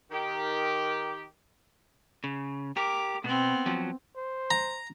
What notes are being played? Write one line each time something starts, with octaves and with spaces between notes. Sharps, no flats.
D#3 G4
C#3
G4 A#4 D6
B2 B3 C4
F3 F#3
C5
A#5